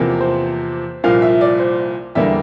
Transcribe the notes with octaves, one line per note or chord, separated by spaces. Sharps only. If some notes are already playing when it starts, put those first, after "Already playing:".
Already playing: E2 C3 F3 A#3
C5
C2 A#2 F3 A#3 F5
E5
D5
C5
E2 D3 G3 A#3 E5